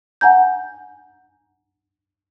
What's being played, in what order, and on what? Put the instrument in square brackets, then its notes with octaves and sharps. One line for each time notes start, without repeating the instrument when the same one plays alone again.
[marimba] F#5 G#5 A#5 G6